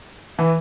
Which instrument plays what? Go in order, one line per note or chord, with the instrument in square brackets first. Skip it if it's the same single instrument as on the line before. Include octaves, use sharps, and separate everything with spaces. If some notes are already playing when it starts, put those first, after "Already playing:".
[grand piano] E3